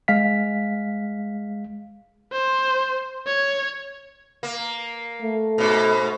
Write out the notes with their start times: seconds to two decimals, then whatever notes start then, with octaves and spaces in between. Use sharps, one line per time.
0.08 G#3 F5 B6
2.32 C5
3.26 C#5
4.43 A#3
5.22 A3
5.58 G#2 B2